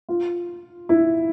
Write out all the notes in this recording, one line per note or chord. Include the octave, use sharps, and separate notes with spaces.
F4
E4